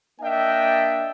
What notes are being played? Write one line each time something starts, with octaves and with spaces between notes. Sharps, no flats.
A#3 D4 D#5 E5 G5